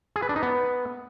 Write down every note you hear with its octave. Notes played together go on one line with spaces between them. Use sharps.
G#4
B4
D4
D#4
B3